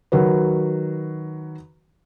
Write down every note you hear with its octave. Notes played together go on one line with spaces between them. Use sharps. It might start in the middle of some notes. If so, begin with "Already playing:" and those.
D#3 F#3 F#4 B4